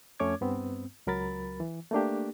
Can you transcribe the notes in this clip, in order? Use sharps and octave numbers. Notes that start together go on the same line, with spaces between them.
F2 A3 C#4 C#5 D6 G#6
G2 B3 C4
C#2 F#3 A#4 B5 A6
E3
A3 A#3 D4 G4